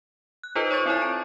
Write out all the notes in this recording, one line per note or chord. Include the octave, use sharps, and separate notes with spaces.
F#6
D#4 F4 A4 B4 C5 D#5
C#5 C#6 A6
C4 E4 C#5 G#5
D7